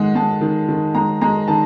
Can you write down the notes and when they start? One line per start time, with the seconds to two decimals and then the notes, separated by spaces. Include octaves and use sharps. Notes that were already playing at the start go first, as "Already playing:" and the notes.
Already playing: D#3 G#3 F#5
0.15 G#3 A5
0.41 D#3
0.69 D#3
0.95 G#3 A#5
1.21 G#3 A#5
1.48 D#3 A5